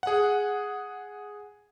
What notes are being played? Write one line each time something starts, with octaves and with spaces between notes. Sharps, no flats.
G#4 F#5